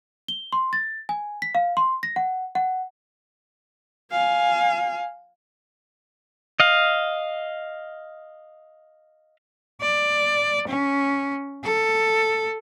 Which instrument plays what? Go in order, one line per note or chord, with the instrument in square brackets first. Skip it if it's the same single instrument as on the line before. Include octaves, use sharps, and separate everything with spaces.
[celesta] G7
C6
A6
G#5
B6
F5
C6
A#6
F#5
F#5
[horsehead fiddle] F5 G#5
[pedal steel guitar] D#5 F5
[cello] D5
C#4
A4